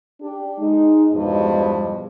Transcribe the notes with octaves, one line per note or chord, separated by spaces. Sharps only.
D4 G4
G#3 D#4
E2 G2 B2 F3 G#3 D#5